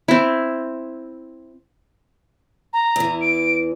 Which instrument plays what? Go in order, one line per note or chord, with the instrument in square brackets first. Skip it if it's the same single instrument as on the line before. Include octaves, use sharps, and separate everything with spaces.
[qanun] C4 E4
[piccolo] A#5
[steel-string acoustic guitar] E2 E3
[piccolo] D7